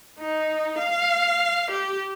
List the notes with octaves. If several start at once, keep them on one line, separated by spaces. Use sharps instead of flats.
D#4
F5
G4